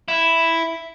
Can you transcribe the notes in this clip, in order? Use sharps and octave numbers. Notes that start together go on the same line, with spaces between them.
E4